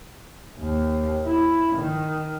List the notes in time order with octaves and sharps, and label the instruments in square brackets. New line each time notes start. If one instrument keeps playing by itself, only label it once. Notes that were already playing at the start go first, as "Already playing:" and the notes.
[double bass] D#2
E4
D#3